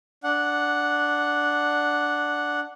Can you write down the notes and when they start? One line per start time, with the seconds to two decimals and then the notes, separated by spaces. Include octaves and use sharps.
0.24 D4 F#5